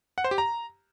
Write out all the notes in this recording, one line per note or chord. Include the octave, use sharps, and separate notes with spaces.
F#5
C5
G4
A#5